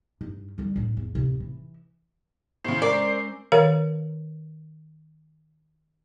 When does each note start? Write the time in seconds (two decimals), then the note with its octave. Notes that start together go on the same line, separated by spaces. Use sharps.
0.21 G2
0.58 D3 G3
0.76 A2 D4
0.97 E2
1.15 D1 C3
1.40 E3
2.64 A2 C#3 C#4 C5
2.82 G#3 C#4 A#4 D5 E6
3.52 D#3 A#4 C#5 F5